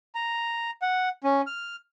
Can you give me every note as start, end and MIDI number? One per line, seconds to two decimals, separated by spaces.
0.15 0.71 82
0.82 1.09 78
1.24 1.42 61
1.47 1.76 89